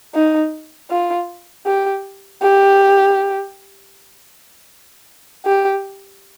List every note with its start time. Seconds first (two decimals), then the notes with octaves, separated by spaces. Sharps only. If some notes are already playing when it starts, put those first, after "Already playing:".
0.14 D#4
0.90 F4
1.66 G4
2.42 G4
5.45 G4